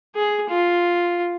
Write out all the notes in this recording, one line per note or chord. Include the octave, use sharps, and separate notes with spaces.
G#4
F4